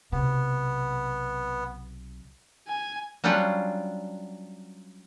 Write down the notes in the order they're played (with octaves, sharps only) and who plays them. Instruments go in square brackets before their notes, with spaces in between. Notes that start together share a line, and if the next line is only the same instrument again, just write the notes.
[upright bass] B1 C3 [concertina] B3
[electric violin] G#5
[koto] F#3 G3 C#4 D4 F4 F#5